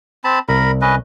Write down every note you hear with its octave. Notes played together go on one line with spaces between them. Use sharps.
C4 A5 B5
C2 A#4 B5
C#4 B4 D#5